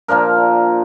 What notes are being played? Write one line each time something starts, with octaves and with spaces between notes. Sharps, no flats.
A#2 F3 D4 A#4